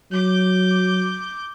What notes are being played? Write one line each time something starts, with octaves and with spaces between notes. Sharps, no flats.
F#3 D6 G6